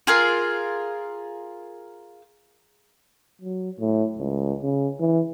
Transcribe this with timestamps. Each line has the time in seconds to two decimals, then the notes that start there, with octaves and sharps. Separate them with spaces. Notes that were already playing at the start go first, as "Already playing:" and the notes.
0.07 F4 G#4 A#4
3.41 F#3
3.80 A2
4.18 C#2
4.63 C#3
5.00 E3